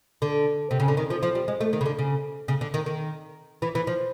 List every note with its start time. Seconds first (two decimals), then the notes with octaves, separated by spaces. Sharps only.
0.22 D3
0.71 C3
0.80 C#3
0.88 D3
0.97 D#3
1.10 F3
1.23 F3
1.35 G3
1.48 G#3
1.61 A3
1.73 D#3
1.81 C#3
1.86 D3
1.99 C#3
2.48 C#3
2.61 D3
2.74 D#3
2.86 D#3
3.62 E3
3.75 E3
3.87 F3